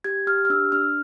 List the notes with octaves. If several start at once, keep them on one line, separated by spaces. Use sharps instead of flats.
G4 G#6
G4 F6
F6
D4 E6
D4 F6